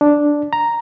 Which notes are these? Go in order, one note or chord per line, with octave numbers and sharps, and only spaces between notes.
D4
A#5